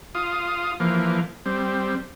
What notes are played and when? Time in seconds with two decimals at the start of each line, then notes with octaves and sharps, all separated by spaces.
0.15 F4 D#6
0.80 E3 F3 A#3
1.46 G3 C4